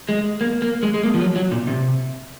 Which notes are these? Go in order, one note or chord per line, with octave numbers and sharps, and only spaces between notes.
G#3
A#3
A#3
G#3
G#3
A#3
F3
F#3
F#3
A#2
C3